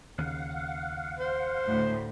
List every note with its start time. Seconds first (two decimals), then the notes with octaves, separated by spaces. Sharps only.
0.18 D#2 C#3 F5 F#5
1.19 C5
1.68 D2 A2